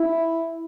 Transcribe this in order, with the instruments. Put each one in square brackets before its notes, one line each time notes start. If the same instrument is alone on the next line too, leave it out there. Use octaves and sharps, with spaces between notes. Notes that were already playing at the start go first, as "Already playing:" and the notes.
Already playing: [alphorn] E4